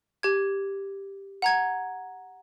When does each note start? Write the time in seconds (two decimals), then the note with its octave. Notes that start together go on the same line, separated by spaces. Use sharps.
0.23 G4 G#6
1.42 F#5 A#5 G#6